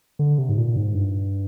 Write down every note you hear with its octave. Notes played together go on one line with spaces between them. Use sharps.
D3
C3
G#2
A#2
G#2
G2